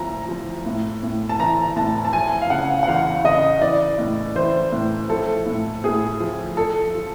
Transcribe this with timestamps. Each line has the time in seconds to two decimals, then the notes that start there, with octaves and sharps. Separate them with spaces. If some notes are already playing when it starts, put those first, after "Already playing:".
Already playing: A2 F3 A#5
0.29 F3
0.66 A2
1.03 A2
1.29 A5
1.39 E3 A#5
1.76 A2 A5
2.05 A5
2.13 F3 G#5
2.42 F5
2.50 C#3 F#5
2.83 F#5
2.87 E2 F5
3.24 C#3 D#5
3.61 E3 D5
3.99 A2
4.36 E3 C5
4.72 A2
5.10 F3 A4
5.46 A2
5.84 A2 G#4
6.20 F3
6.57 F3 A4
6.95 F3